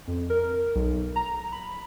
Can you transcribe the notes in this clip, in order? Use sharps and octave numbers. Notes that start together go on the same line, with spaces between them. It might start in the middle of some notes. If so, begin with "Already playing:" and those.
F2
A#4
B1
A#5
B5